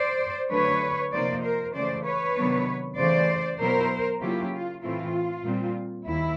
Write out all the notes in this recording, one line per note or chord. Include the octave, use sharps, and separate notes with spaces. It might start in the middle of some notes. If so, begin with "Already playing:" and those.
Already playing: C5 D5
D3 F#3 A3 D4 B4 C#5
C3 F3 A#3 D#4 C5 D5
A#4 C5
C#3 E3 A3 C5 D5
B4 C#5
C3 D#3 F#3 B3 D4
C#3 E3 A3 C5 D5
B2 F#3 B3 E4 A#4 C5
C#3 F#3 A#3 C#4 E4 F4 G4
F4
A2 E3 A3 C4 E4 F4
A#2 G3 C4
D#2 E4